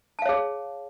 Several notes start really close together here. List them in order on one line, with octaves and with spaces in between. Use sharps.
A5 F5 C#5 G#4